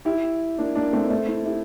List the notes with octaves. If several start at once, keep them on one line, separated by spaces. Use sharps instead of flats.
E4 G4
A#3 D4
A#3 D4
A3 C4
D4
A3 C4
C4 E4
E4 G4